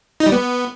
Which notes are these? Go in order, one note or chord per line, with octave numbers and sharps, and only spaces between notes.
D#4
G3
B3